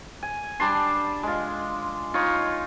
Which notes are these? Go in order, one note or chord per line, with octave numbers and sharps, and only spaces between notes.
G#5
G3 D4 A5 C6
G#3 F4
D#4 F4 C#5